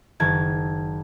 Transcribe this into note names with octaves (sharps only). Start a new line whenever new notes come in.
F#1 D#3 A5 G#6